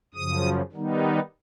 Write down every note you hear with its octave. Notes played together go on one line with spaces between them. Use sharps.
F#2 C#3 F3 D#6
D#3 G3 B3 D#4